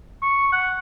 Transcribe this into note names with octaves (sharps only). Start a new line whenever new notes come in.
C#6
F#5